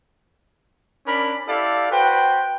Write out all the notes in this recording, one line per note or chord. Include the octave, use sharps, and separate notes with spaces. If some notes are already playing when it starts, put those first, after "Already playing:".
C#4 D4 A#4 D5 B5
E4 G4 A4 D5 F5
F#4 B4 C5 G5